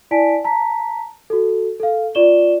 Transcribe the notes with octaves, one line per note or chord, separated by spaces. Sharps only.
E4 D5 G#5 A5 B6 D7
A5 A#5 B6
F#4 A4
A4 F5
F4 D5 C#6 E7 G7